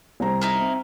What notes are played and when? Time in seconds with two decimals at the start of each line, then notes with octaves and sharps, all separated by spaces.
0.20 C2 C5 A#5
0.41 D#4 E4 A#4
0.60 C4